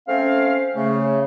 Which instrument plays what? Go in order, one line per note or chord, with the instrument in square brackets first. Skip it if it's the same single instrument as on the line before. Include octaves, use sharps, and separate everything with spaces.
[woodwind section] A3 C4 C#4 F5
C#3 A3